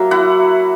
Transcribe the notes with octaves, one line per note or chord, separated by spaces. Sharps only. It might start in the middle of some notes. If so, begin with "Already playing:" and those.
Already playing: F#3 A#3 E5
E4 F#5